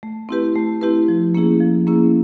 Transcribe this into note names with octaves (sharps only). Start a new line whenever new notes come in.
A3
C4 E4 G4 B4
A3
C4 E4 G4 B4
F3
A#3 C#4 E4 G#4
F3
A#3 C#4 E4 G#4